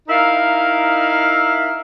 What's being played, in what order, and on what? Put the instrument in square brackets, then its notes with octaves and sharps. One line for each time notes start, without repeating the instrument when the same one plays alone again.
[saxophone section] D#4 E4 A#4 F5